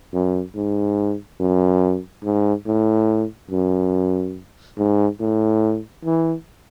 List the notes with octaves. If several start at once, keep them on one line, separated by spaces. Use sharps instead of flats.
F#2
G#2
F#2
G#2
A2
F#2
G#2
A2
E3